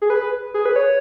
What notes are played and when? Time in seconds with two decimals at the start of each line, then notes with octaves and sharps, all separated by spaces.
0.02 G#4
0.10 B4
0.54 G#4
0.65 B4
0.76 C#5